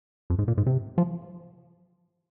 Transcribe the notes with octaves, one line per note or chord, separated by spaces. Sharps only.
F2
G#2
A#2
G#2
C3
F3